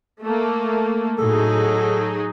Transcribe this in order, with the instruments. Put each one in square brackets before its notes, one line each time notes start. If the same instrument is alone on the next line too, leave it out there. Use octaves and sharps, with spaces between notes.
[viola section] A3 A#3
[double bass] A2 [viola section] F#3 D#4 G#4 [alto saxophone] A4